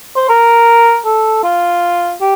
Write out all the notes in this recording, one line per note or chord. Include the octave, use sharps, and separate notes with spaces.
C5
A#4
A4
F4
G4